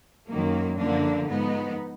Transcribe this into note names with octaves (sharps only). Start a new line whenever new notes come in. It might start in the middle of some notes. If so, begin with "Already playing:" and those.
F#2 D#3 F#3 A#3
F#2 D3 F3 A#3 D4
G#2 F3 B3 D#4